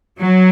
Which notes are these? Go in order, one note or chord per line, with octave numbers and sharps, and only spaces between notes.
F#3